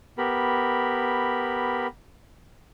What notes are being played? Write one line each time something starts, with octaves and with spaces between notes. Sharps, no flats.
B3 G4 A#4 B5